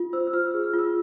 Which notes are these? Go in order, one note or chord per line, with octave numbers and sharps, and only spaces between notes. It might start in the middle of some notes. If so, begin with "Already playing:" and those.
Already playing: F4
C5 E6
E6
F4 F6
G#4
F6
F4
E6